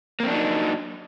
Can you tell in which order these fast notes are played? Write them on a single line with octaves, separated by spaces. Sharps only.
A#3 C4 D4 F#3 D#4